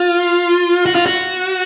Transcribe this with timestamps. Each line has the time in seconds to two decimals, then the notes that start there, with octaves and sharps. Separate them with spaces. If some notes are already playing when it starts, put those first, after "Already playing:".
Already playing: F4
0.86 F#4
0.95 F4
1.06 F#4